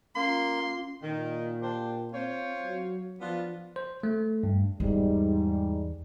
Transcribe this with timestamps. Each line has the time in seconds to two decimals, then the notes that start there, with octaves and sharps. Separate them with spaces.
0.15 A#3 C#4 F4 C6
1.02 A#2 D#3
1.61 D4 G4 C5
2.13 C4 F4 C5 C#5
2.63 F#3
3.20 F3 B3 D4 F4
3.76 C5
4.03 A3
4.43 G2
4.80 E2 G#2 G3